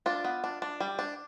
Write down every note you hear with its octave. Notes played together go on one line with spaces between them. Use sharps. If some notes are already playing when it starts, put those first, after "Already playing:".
D4 F4
B3
D4
D4
G3
D4